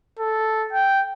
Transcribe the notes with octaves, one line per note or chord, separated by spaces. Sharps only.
A4
G5